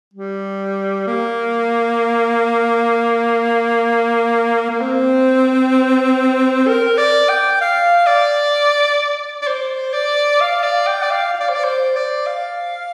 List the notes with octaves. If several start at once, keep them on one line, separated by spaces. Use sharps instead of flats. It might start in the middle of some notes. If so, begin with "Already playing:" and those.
G3
A#3
A#3
C4
A#4
D5
G5
F5
D5
D5
C5
D5
F5
D5
G5
D5
F5
F5
D5
C5
D5
C5
D5
F5